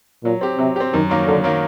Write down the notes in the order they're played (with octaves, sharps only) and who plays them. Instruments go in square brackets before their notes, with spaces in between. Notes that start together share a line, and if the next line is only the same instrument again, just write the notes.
[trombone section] A#2 [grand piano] F#3
[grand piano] C4 G4
[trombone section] C3 [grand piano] F#3
[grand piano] C4 G4
[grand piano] F#2 [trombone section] D#3
[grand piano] D#3 F#3 A#3
[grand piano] F#2 [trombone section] D3
[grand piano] D#3 F#3 A#3